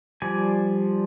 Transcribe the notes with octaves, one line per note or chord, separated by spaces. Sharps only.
F3 G3 D5 G#5